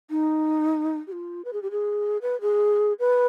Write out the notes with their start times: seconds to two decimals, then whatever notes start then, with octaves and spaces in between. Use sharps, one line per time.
0.10 D#4
1.07 G4
1.12 F4
1.45 B4
1.53 G#4
1.62 G4
1.71 G#4
2.22 B4
2.41 G#4
2.99 B4